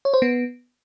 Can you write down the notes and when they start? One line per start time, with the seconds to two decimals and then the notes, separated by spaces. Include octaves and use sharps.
0.05 C#5
0.14 C5
0.22 B3